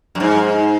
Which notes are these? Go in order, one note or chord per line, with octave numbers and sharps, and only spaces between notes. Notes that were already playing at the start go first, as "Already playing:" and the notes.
F#2
G#2